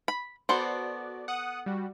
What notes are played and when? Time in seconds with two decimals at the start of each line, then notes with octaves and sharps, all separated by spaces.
0.08 B5
0.49 B3 F#4 A4 C5 D5
1.28 F#5 D#6
1.66 G3 F#4